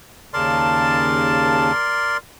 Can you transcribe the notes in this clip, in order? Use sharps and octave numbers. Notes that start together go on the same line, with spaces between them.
D#2 C#3 A#4 D5 A5 C6